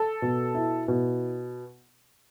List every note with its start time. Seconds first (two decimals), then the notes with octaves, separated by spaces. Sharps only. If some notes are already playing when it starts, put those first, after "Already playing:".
Already playing: A4
0.22 B2
0.54 E4
0.88 B2